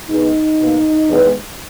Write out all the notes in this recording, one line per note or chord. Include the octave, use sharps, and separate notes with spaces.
B2 G#3 B3 D#4
B2 A#3
E2 D#3 G#3 B3